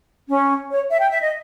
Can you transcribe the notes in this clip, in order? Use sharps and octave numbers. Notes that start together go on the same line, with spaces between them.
C#4
C#5
E5
G5
E5
D#5